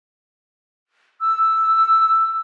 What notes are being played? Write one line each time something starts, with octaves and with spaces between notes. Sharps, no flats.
E6